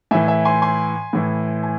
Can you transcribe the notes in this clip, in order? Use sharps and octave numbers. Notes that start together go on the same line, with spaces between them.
A2 E3 E5 G#5
E5 G#5
G#5 C6
G#5 C6
A2 E3
G#5